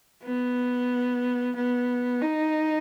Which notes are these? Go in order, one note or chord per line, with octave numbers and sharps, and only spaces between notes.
B3
B3
D#4